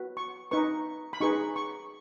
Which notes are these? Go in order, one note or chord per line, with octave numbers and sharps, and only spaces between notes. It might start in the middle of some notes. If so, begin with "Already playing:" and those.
Already playing: F#4 B4
C#6
D#4 B4 C#6
B5
D#4 G#4 B4 C#6
C#6